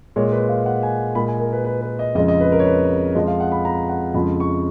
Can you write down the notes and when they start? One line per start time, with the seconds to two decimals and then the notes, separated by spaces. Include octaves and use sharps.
0.16 A#2 G#3 C#5
0.32 B4
0.49 F5
0.66 F#5
0.83 G#5
1.15 A#2 G#3 B5
1.28 G#5
1.40 A#4
1.53 B4
1.65 B4
1.81 B4
1.99 D#5
2.15 F2 C#3 G#3 D#5
2.28 D#5
2.41 B4
2.52 A#4
2.59 C#5
2.65 B4
3.15 F2 F3 G#3 D#5
3.27 F5
3.40 F#5
3.52 B5
3.65 A#5
3.89 F#5
4.14 F2 C#3 F3 G#3 B5
4.40 C#6